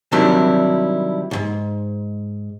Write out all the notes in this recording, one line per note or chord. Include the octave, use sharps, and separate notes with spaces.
C3 D#3 F#3 G3 D4 E4
B1 G#2